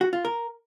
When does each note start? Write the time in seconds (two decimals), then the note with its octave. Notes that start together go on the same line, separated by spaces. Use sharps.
0.01 F#4
0.13 F4
0.25 A#4